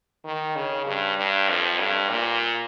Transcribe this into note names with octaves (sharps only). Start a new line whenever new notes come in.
D#3
C#3
G2
G2
F2
G2
A#2